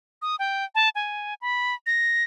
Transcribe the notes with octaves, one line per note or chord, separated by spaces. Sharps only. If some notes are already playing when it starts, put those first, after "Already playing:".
D#6
G5
A5
G#5
B5
A#6